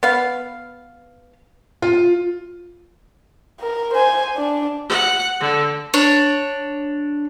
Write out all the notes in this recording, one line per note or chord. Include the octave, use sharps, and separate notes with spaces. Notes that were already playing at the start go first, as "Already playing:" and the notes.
B3 F5
F4
A#4
C5 G#5
D4
F#5
D3
D4 C#5